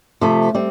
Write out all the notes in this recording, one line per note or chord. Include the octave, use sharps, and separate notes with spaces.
C3 F3 A3
G3 C4